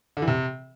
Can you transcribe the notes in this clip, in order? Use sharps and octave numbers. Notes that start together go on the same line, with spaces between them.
D3
E3
C3